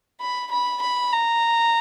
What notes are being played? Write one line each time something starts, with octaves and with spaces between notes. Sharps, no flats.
B5
B5
B5
A#5